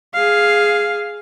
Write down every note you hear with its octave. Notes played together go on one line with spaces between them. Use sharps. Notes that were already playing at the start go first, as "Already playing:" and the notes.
G#4 F5